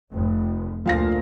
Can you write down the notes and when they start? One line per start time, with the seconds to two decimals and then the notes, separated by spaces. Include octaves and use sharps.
0.13 F1
0.86 D2 A#2 F3 F5 A#6